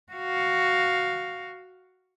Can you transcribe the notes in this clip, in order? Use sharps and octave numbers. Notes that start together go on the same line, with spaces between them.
F#4 F5